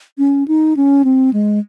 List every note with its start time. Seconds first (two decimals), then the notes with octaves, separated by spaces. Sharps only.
0.18 C#4
0.48 D#4
0.76 C#4
1.04 C4
1.33 G#3